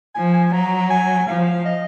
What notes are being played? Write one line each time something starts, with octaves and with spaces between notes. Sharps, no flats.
F3 G#5
G#5
F#3 A#5
G#5
F3 F5
D#5